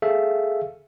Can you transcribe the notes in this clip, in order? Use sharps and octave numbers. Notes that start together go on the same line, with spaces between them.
G#4 A4 E5 F5